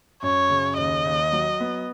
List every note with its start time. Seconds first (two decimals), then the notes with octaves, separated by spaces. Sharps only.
0.23 F#2 C#5
0.50 C#3
0.78 D#2 D#5
1.05 D#2
1.33 F#3
1.60 B3